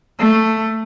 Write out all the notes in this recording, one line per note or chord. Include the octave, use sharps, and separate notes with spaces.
A3